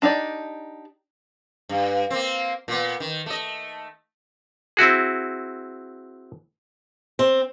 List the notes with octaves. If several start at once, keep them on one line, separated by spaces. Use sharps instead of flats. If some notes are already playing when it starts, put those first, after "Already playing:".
D4 D#4 G4 D5
G2
A#3 C4
A#2 B3
D#3
A3 D#5
C4 E4 F#4 G#4
C4